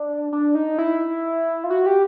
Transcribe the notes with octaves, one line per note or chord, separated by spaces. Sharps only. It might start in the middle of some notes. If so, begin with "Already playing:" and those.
Already playing: D4
D4
D#4
E4
F4
F#4
G4